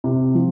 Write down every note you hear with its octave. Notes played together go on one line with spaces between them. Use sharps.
C3
F3